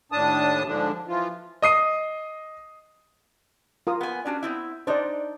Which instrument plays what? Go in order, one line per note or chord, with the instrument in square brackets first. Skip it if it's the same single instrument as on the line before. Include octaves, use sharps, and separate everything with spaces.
[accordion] D#2 A2 D4 A5 D#6
G#2 D3 F3 D4
E3 F3 F4
[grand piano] D#5 D#6 C7 D#7
[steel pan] F4 A#4 D#6
[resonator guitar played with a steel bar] B3 G#5
C#4 D4 F#4
B3 C4 E4
[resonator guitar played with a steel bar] D4 D#4 [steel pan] C5 D5